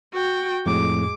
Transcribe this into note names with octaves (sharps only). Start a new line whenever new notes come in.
F#4 G5
F2 A2 G#3 D6